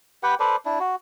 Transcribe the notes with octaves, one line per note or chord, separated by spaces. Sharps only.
G4 B4 F#5 G5
A4 B4 C5 D5
D4 E4
F#4